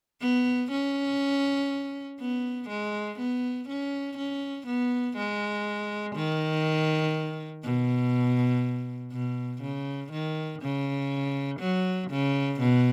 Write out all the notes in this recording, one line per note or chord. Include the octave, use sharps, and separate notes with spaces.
B3
C#4
B3
G#3
B3
C#4
C#4
B3
G#3
D#3
B2
B2
C#3
D#3
C#3
F#3
C#3
B2